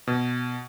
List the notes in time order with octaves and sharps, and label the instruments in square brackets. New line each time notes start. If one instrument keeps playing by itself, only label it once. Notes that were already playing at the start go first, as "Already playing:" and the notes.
[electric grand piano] B2